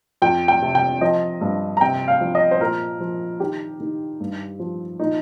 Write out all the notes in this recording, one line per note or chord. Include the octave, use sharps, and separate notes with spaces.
F2 G5
G5
C3
G5
F3 D#5
G2
A#5
C3 G5
F5
F3
D#5
C5
A#2 A#4
F3
D#3 G4
D#3
G2
F3
A#2 D#4